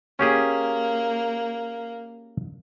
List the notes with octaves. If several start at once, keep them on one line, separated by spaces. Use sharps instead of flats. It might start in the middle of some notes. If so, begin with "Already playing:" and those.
A#3 C#4 G4 G#4